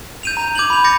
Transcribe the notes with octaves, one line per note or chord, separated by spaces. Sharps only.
G6 D#7 F7
A#5
D6 G6 G#6 F7 F#7
B5 F7
D6 G6 A6 A#6 C#7